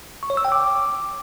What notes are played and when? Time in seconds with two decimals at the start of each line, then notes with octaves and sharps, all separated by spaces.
0.23 C#6
0.30 C#5
0.37 E6
0.45 G5
0.52 D6